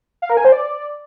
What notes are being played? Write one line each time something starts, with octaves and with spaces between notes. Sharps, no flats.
F5
A#4
G#5
C5
D5